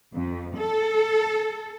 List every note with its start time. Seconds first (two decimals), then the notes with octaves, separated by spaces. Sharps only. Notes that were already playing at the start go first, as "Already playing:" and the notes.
0.15 F2
0.57 A4